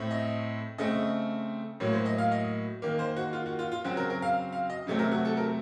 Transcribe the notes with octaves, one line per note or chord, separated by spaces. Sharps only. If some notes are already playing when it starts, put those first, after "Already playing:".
Already playing: A2 A3 C4
D#5
C#3 A3 C4 D#5
A2 F#3 A#3 C#5
C5
D#5
F5
D#5
D#3 A#3
C5
F#4
F4
F#4
F4
F4
C#3 F#3 C4 F#4
A#4
A#4
F5
F5
D#5
C3 F#3 A3 C4
A#4
F#4
A4
A#4